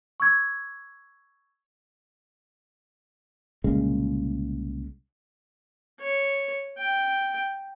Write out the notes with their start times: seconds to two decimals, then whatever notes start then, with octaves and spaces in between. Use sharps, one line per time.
0.20 C#6 E6 G#6
3.64 C2 A#2 C#3 G#3
6.01 C#5
6.78 G5